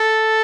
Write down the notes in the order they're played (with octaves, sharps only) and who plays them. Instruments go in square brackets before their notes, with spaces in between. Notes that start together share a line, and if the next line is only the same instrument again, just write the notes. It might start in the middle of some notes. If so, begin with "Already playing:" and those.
Already playing: [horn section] A4